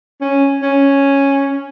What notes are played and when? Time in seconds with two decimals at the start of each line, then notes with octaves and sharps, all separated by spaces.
0.21 C#4
0.62 C#4